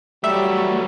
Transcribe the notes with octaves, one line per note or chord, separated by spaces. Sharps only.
E2 F#3 G3 A3 E5